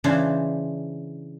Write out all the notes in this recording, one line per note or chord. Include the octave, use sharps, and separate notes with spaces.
C#3 E3 D4 C5